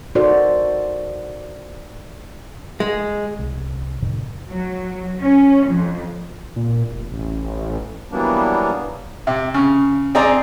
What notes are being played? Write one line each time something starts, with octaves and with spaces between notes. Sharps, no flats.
D#4 F#4 A4 A#4 C5 D5
G#3
C2
F2 A2 C3 D#3
F#3
C#4
F2
A#2
F1
A1
E3 F#3 G3 A#3 B3 D4
C3
C#3
C4 G#4 D5 A#5